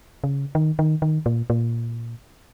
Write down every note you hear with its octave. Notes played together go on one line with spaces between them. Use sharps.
C#3
D#3
D#3
D#3
A#2
A#2